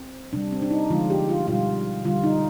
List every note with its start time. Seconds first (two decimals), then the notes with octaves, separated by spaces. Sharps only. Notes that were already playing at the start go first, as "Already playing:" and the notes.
Already playing: C4
0.33 C3 G3 D4
0.52 C4
0.62 D4
0.71 D#4
0.90 D3 F3 G#3 F4
1.10 G4
1.29 F4
1.47 B2 G3 F4
2.05 D3 G3 F4
2.24 D#4